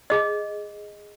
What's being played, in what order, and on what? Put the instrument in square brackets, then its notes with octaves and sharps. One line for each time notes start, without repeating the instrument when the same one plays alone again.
[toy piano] G#4 D#5